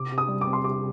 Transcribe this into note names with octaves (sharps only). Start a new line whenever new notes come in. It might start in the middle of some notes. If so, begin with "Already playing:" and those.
Already playing: C3 D6
C3
D#6
G3
D6
C4
C6
C3 D6